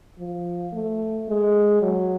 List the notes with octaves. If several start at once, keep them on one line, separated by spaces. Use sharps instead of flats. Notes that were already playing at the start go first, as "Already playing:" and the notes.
F3
A3
G#3
F#3